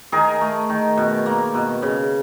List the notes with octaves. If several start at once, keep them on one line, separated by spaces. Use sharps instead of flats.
D#3 G#4 A#4
A3
D#3
B2
A#3
B2
C#3